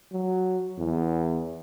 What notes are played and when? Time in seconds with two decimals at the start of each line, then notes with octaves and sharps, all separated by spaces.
0.12 F#3
0.78 E2